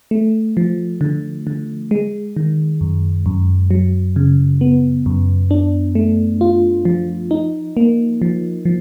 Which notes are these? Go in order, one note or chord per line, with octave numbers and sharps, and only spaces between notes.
A3
F3
D3
D3
G#3
D#3
F#2
F#2
F#3
C#3
B3
F#2
D4
A3
F4
F3
D#4
A#3
F3
F3